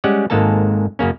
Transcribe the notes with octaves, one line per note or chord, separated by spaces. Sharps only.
G3 G#3 C#4 G4 F#5
G#1 G#2 G#3 A#3 A4 A5
F#2 C#3 A#3 C#4